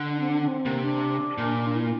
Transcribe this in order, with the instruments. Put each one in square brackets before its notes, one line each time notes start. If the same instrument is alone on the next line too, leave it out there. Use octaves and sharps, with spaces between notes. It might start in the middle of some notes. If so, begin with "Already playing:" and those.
Already playing: [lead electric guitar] D3
[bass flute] D4
C4
D4
D4
C4
[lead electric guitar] C3 [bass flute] A#3
[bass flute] D4
[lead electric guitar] A#2
[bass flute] E4